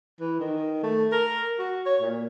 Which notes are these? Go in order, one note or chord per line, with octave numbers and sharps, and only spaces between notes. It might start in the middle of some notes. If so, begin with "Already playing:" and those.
E3
D#3
A3
A#4
F#4
C#5
A#2